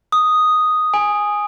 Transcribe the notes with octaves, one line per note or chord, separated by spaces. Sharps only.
D#6
G#5